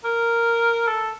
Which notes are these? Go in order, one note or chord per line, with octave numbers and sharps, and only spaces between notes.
A#4
A4